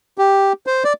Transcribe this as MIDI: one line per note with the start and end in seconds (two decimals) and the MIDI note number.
0.18 0.53 67
0.66 0.83 72
0.84 0.93 74